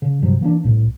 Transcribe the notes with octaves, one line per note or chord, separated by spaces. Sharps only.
C#3
G2 C3 F3 F#3
E3 A#3 C4 D4
C2 A2